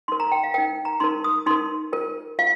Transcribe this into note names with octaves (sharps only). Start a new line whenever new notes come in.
D#4 A#4 C6
A#5
G5
F5
D#4 A#4 G5
A#5
D#4 A#4 C6
D#6
D#4 A#4 C6
F4 A#4
F4 F5